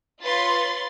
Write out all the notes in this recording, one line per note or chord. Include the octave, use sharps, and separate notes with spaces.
F4 B4 C#5 B5 C6 A6